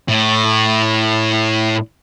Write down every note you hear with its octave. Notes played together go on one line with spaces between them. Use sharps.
A2